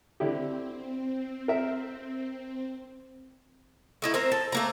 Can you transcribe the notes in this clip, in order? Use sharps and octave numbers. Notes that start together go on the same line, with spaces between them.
D3 C4 E4 G4
A#4 E5
A3 D#4 E4
C4 A#4 C5
A4
A3 A#3 A#5